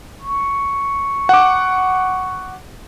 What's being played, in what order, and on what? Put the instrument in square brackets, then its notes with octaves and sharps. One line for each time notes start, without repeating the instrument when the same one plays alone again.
[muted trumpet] C#6
[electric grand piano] F#5 D6